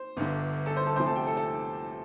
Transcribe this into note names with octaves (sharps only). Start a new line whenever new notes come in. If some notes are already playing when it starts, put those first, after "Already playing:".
Already playing: C5
G1 G2 D3
A4 A5
C5 C6
A4 A5
D2 C3 F3 C5 C6
A4 A5
G4 G5
A4 A5
A4 A5